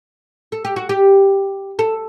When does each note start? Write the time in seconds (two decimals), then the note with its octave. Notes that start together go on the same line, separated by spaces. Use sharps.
0.52 A4
0.65 G4
0.76 F#4
0.89 G4
1.79 A4